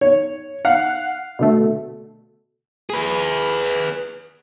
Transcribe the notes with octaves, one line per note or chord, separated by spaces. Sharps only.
C#5
F5 F#5
B2 D3 A3
G#4 B4